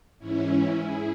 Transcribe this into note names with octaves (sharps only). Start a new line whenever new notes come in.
G#2 E3 C#4 E4
E4 G#4